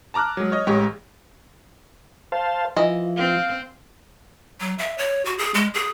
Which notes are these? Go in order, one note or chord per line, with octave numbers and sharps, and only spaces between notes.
A5 A#5 D6 F6 F#6
F#3 G#3
C#5 D#5
A1 G#3 G4 C#5 C#6
C5 F5 A5
E3 F3 D#5
C4 F5
F#3
E5
C#5
F#4
G#4
G#3
G#4